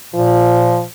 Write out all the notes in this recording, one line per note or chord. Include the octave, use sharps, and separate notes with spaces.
A#2 F3